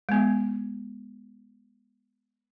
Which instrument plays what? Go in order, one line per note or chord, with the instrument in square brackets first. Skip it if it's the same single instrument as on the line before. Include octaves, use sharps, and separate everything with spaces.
[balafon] G#3 B3